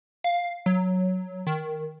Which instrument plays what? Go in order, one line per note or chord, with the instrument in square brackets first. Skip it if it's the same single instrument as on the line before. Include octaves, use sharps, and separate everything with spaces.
[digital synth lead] F5
F#3
D#3